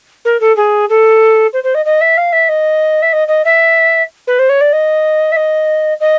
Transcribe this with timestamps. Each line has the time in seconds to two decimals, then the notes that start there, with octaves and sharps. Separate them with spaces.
0.25 A#4
0.41 A4
0.57 G#4
0.90 A4
1.53 C5
1.64 C5
1.75 D#5
1.86 D#5
2.01 E5
2.17 F5
2.33 E5
2.49 D#5
3.02 E5
3.13 D#5
3.28 D#5
3.45 E5
4.27 B4
4.39 C5
4.49 C#5
4.61 D5
4.73 D#5
5.32 E5
5.36 D#5
6.00 D#5